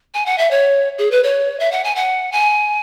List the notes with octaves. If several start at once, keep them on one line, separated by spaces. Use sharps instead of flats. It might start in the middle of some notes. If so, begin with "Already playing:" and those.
G#5
F#5
E5
C#5
G#4
B4
C#5
E5
F#5
G#5
F#5
G#5